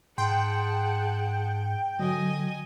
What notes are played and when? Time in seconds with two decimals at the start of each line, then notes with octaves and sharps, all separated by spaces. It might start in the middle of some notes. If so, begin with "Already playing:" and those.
0.18 G#2 G#4 F#5 G5 A5 C6
1.99 D3 F#3 D#5 G#5 D#6